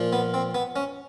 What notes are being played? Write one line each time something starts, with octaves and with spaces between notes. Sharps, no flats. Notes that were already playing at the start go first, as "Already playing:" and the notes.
Already playing: A#2 F3
B3
C4
B3
C#4